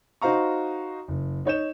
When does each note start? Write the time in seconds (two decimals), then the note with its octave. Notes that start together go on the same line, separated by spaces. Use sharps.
0.22 D#4 F#4 C5 F5 A#5 C#6
1.08 F#1
1.45 D#4 C#5 G6 E7